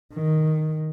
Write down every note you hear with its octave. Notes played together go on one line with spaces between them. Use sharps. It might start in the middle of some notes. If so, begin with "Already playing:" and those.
D#3